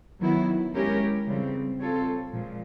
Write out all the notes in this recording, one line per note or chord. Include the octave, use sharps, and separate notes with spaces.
D#3 F#3 B3 E4
G#3 C#4 E4 G4 A#4
C#3 E3 G3 C4
G3 C4 F4 A4 C#5
A#2 F3 G#3